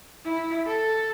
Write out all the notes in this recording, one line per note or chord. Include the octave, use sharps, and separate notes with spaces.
E4
A4